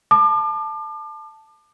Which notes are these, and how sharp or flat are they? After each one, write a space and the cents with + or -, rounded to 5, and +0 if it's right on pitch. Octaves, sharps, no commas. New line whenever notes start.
A5 +0 D6 +40